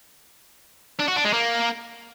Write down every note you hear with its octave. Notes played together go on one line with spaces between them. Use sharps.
D4
F#4
D4
G#3
A#3